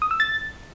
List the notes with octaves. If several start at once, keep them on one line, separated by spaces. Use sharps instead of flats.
D#6
E6
A6